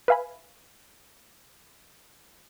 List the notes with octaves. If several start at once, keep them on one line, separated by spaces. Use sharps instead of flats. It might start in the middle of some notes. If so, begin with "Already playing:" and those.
B4 E5 F5 G#5 B5